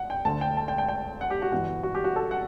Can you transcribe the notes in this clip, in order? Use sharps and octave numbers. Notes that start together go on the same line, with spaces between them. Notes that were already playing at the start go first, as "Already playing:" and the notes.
Already playing: F#5
G5
D2 D3 A5
G5
A5
G5
G5
G5
F#5
G4
F#4
G1 G2 E3 F#4
F#4
G4
F#4
A4
F#5